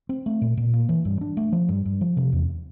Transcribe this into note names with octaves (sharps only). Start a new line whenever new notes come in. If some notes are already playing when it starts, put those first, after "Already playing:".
C4
A3
A#2
A#2
A#3
E3
G2
D4
A3
F3
G2
G2
F3
C3
E2